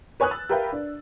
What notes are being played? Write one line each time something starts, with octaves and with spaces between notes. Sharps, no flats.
B4 C#5 G#5 D#6 F#6
E6 A6
G4 A#4 B4 E5 F5 G5
D4